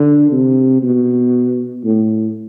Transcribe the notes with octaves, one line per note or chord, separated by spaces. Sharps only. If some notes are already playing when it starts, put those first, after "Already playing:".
Already playing: D3
C3
B2
A2